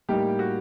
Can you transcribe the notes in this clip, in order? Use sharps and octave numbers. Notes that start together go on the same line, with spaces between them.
A2 G3 A#3 D#4 G4
F#4